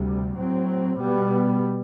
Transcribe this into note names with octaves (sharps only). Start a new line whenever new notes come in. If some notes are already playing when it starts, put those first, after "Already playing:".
Already playing: D2 C3 G3
A2 F#3 C4
B2 G3 B3